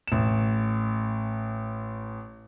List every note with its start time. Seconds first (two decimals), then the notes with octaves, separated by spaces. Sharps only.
0.07 A1 E7